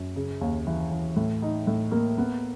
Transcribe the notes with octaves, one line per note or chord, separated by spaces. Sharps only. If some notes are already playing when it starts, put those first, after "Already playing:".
Already playing: F#2
C#3
D#2
E3
E3
A2
D#4
A2
A#3
B3